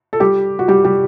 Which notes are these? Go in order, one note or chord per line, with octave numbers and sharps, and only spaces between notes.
A4
G3 G4
F#4
G3 G4
G3 G4